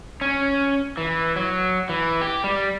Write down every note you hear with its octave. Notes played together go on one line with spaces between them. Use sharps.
C#4
E3
F#3
E3
G4
G3